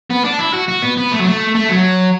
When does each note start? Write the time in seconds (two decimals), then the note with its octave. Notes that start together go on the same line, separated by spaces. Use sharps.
0.11 B3
0.25 D4
0.39 E4
0.54 F#4
0.68 F#4
0.82 B3
0.97 B3
1.12 A3
1.19 F#3
1.26 A3
1.55 A3
1.70 F#3